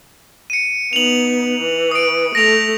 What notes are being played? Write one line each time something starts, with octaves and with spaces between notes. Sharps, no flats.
C#7 D#7
B3 D#4 F7 F#7
E3
D#6 D7
A3 A4 A#6 D7 F7